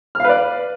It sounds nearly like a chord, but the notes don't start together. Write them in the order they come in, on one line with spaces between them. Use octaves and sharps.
F6 F5 B4 D5